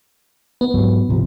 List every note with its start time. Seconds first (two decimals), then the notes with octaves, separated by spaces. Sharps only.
0.61 B3
0.74 G#2 F#3
1.09 G#1 C3 F3